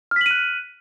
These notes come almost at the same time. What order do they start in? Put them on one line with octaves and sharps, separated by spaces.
F6 B6 F#7 D#7 F#6